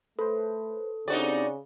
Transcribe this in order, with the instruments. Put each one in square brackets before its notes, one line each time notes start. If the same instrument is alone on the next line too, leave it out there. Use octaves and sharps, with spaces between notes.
[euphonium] A3 [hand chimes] A4 [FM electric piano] B4 C5
[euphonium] C#3 [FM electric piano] C4 D4 G4 [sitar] D#4 F#4 D5